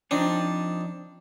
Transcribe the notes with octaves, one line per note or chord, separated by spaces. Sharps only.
F3 C4 D4 D#4